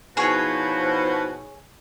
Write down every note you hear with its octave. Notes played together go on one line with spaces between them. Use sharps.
B2 F3 D#4 E4 F#4 G#4 C#5